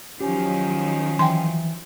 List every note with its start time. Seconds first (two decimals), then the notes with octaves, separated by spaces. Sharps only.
0.20 D#3 F3 F#3 C#4 G4
1.19 E3 E5 G5 G#5 C6